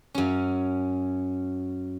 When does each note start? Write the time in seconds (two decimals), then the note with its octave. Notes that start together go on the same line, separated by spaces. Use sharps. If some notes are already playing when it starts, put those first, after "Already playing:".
0.15 F#2 C#4